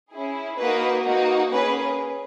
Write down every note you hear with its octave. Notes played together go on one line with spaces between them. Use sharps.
C#4 E4 G#4
A#3 D#4 F#4 B4
A#3 D#4 F#4
A#3 C#4 G#4 B4